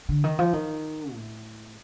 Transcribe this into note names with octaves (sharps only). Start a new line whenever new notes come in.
D3
D#3
F3
D#3
A2